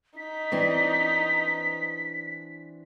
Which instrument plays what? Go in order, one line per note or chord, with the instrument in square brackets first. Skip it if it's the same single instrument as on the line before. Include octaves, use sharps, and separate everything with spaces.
[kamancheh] D#4 [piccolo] B6
[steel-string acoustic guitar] E3 C4 D4